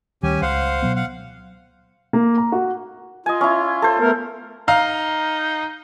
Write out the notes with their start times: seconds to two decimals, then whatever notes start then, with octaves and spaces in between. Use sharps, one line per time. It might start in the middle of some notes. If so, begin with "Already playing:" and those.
0.23 D2 D#3 G3 C#4 G4 G#5
0.42 C#2 C5 F5 F#5
0.82 B2 F#3 B3
0.96 F5 F#5
2.13 A#3
2.38 A#5
2.52 F#4
3.26 F4 D#5 G#5
3.41 C#4 E4
3.82 A4 C5
3.99 A3 B3 A#4
4.68 D#4 F5 A#5